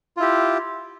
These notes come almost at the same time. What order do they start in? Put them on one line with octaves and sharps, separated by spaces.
F4 E4 G4